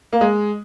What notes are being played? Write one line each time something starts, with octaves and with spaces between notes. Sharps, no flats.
A#3
G#3